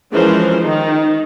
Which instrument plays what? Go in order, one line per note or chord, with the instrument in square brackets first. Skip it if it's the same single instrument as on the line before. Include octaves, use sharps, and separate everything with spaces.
[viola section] E3 F3 G#3 C#4 A#4 C5
D#3 D#4